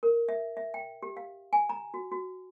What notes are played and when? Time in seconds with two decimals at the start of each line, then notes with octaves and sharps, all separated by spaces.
0.03 A#4
0.29 E5
0.57 E5
0.74 G5
1.02 G4
1.17 F5
1.53 G#5
1.69 A#5
1.94 F#4
2.12 F#4